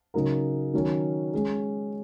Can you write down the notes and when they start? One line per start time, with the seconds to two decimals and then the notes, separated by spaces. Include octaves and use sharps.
0.14 C#3 F#3 D#4 A#4
0.74 D#3 F#3 C#4 A#4
1.33 G#3 C#4 G#4